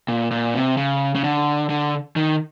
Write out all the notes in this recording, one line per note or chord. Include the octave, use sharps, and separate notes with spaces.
A#2
A#2
C3
C#3
C#3
D3
D3
D#3